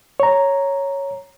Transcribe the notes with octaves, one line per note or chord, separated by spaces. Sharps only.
C#5 A#5